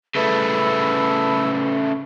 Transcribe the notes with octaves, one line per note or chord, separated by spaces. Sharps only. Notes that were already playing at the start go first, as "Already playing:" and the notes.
C#3 A3 E4 B4 E6